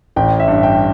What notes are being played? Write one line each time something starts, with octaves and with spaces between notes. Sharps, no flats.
A1 G5
E5
G2
G5